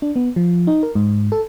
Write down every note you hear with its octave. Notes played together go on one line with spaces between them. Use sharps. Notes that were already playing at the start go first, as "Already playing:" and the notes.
D4
B3
F3
D#4
A#4
G#2
A4